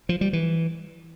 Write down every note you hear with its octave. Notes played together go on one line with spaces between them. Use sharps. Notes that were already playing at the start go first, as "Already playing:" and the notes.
F3
G3
E3